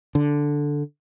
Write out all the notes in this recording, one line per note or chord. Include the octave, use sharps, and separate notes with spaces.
D3